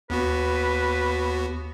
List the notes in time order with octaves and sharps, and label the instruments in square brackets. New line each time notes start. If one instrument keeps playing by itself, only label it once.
[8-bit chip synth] D#2 B3 F#4 [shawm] B4